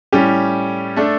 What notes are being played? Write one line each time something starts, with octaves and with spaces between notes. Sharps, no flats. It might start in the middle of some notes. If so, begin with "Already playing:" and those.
A2 G3 C#4 G4
A3 D4 A4